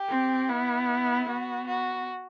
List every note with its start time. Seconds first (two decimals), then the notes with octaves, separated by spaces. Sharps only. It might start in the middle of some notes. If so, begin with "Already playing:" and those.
Already playing: G4
0.09 C4
0.49 B3 E4
1.28 B3 F#4
1.67 F#4